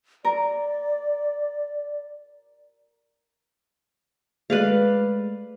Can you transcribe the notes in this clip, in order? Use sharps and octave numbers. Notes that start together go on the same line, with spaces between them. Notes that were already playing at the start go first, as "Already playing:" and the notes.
A#4 D5
G#3 A3 B4 D5 F5